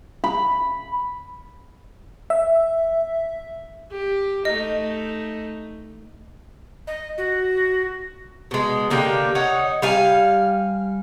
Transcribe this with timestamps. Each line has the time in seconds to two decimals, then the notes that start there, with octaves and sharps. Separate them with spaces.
0.24 B5
2.30 E5
3.91 G4
4.45 A3 D#4 D#5
6.87 D#5
7.18 F#4
8.51 B2 G#3
8.90 D3 A#3 G4 G5
9.35 D#4 C#5 F#5
9.82 G3 F5 G#5